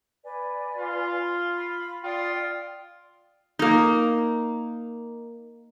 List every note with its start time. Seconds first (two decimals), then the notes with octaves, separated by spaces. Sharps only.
0.24 B4 D5 G#5
0.77 F4
1.57 B5
2.04 F4 D5 G5 D#6
3.59 A#3 D#4